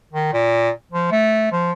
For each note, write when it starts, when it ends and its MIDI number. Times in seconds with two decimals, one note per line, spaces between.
0.13 0.31 51
0.33 0.70 46
0.92 1.08 53
1.11 1.51 57
1.52 1.72 53